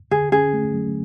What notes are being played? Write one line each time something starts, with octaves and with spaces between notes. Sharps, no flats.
D3 G#4
C#4 G#4
A3
F#3